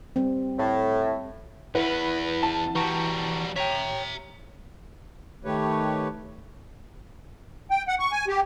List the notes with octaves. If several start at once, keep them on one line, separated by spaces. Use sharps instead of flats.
G3 C4
A2
E2 B3 E4 B4 F#5
A5
E3 G3 F#4 A#5 C#6
C#5 E5 G5 A#5
D#3 A3 G4 B4 C#5
G5
F#5
C#6
G#5
G4